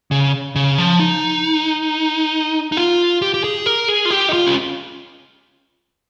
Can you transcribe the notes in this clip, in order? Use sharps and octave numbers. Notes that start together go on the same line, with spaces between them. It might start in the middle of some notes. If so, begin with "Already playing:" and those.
C#3
C#3
F3
D#4
D#4
F4
G4
G4
G#4
A#4
G#4
F4
G4
D#4
F4
C#4